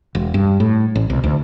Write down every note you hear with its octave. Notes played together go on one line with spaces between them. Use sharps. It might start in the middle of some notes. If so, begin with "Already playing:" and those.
E1
G2
A2
A1
C2
D2